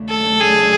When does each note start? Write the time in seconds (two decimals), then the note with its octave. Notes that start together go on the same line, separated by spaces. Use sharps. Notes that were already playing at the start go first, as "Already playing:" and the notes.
Already playing: D#2 C#3 F#3 A3 D4
0.09 A4
0.41 G#4